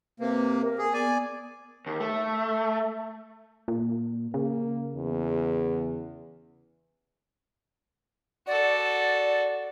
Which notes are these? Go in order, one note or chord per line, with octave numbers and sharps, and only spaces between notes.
C3 A#3 B4
A#4
G#4
B3 D5 G#5
D#2
A3
A#2
C#3 A#3
E2
F#4 A4 D5